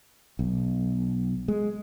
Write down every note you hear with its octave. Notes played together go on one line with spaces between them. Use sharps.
B1
G#3